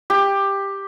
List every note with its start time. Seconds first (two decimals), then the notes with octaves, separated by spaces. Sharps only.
0.10 G4